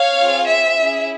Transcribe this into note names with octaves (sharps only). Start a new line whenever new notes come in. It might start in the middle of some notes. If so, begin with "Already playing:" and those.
Already playing: C#5 F5
C4 F4 G#4
E5
C#4 E4 G#4